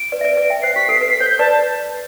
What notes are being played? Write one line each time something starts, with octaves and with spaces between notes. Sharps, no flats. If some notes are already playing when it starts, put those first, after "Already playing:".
Already playing: D7
B4 D5
E5
B4 D5
B4 D5
E5 G5
C5 E5 C7
G4 B6
A4 C7
B4 C7
B6
C5 G6
G6
B4 D5 A5